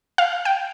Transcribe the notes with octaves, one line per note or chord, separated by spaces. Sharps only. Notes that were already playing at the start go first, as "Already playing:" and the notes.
F5
G5